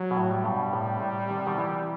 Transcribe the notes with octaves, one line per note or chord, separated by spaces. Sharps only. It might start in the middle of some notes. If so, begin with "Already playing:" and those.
Already playing: F#3
B2
A2
G3
G2 B2
A2 C3
A2 C3
D#3
C3
B2 D#3
C3 E3